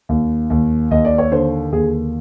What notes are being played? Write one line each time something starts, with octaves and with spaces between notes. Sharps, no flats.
D#2
D#2
D#2 D#5
D5
C#5
D3 C5
D#2 G#4